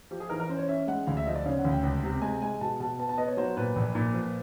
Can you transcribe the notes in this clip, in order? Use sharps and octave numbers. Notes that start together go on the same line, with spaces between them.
F3 G4
G#4
E3 A#4
A#4
C#4 C5
C#5
C#4 E5
G#3 F#5
D2 F5
E5
F3 D#5
D5
C#3 F5
F#5
D2
G5
C#2
C3
G#3 G#5
G#3 G#5
B2 A5
B2 A5
B3 A5
A5
B3 D#5
C#5
F#3 C5
A#2 B4
A#1
A#2
F3